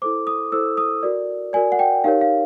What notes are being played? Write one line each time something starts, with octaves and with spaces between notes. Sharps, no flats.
E4 A4 C5 D6
D#6
E4 A4 C5 E6
D#6
F#4 A#4 D5
F#4 A#4 D5 G#5
F#5
G5
D#4 G4 A#4 C#5 F5
F5